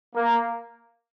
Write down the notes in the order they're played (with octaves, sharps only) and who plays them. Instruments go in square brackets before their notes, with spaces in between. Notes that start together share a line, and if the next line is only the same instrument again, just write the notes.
[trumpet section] A#3